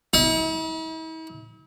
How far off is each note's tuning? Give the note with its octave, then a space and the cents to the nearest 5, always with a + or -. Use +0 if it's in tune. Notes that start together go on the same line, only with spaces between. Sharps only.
E4 -45